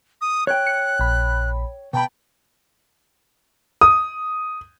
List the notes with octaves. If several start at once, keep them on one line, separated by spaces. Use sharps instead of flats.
D#6
C#5 G5 F#6
C#7
A#1 B5
B2 G5 A5 B5
D#6